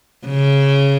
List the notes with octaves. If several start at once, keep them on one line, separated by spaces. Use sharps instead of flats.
C#3